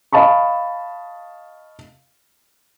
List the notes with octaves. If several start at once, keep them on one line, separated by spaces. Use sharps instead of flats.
D#5 F5 A5 B5 C#6